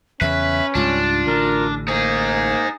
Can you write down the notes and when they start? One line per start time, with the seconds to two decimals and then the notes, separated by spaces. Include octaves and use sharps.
0.21 E2 C#3 C#4 B4 E5
0.75 C#2 G#2 G3 D4 F4
1.27 A1 D3 A#4
1.88 A#3 D#4 G#4 C5